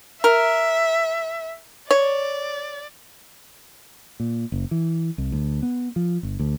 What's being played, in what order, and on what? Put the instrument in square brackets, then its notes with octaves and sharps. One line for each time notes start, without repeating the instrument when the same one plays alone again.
[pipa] A#4 [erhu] E5
[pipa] C#5 [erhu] D5
[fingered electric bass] A#2
F#1
E3
C2
D2
B3
F3
G1
D2